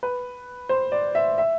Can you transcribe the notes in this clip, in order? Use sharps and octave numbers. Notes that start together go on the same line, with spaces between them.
B4
C5
D5
E5
E5